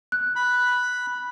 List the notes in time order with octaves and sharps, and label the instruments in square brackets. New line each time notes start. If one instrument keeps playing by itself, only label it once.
[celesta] F#6
[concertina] B5